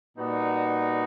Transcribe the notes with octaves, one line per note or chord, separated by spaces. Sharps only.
A#2 G3 B3 D#4 F#4